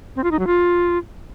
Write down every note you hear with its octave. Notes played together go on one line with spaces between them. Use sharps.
C4
F4
D#4
F#3
F4